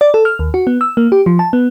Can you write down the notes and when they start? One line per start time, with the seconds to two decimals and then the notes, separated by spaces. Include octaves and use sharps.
0.01 D5
0.14 A4
0.25 F6
0.39 D#2
0.54 F#4
0.67 B3
0.81 E6
0.97 A#3
1.12 G4
1.26 F3
1.39 A5
1.53 B3